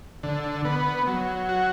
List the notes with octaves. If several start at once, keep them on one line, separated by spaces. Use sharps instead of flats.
D3
B3
F#3
F#4